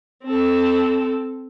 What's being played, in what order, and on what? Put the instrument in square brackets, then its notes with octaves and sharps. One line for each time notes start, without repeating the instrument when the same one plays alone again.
[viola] C4 A4